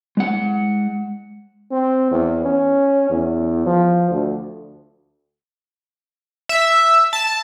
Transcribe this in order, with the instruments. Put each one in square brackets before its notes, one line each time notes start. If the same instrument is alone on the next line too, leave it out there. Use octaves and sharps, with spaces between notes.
[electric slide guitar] G#3 F#5
[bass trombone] C4
E2
C#4
E2
F3
D2
[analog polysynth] E5
A5